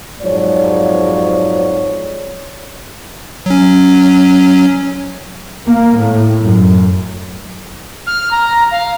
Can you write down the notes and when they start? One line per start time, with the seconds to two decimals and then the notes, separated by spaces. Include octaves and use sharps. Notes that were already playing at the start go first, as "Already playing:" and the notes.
0.21 F2 G#2 F3 F#3 C#5 D5
3.46 F#3 C#4
5.66 A#3
5.96 A2
6.42 F#2
8.07 F6
8.31 A#5
8.71 F5